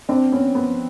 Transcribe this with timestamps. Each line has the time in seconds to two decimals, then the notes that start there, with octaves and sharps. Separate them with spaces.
0.09 C4 D4
0.32 B3 C#4
0.55 B3